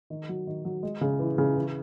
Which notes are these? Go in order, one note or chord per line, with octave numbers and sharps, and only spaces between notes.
D#3
F#3
D#3
F#3
G#3
C#3
E3
C#3
E3